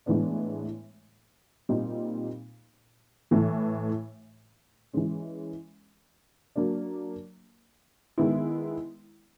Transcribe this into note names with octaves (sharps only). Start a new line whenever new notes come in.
A2 E3 G#3 B3 D4
A#2 G3 C4 D#4
A2 E3 A3
E3 G#3 C#4
F#3 A#3 D4
D#3 G#3 B3 E4